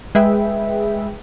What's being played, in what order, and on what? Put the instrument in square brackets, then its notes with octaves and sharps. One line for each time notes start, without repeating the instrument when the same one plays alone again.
[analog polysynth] G#3 G#4 B4 E5 G5